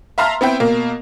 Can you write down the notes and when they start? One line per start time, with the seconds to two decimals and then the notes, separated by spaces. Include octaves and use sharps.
0.18 E5 F5 A5 A#5 C6 F6
0.41 B3 C4 E4 G5
0.60 B2 A#3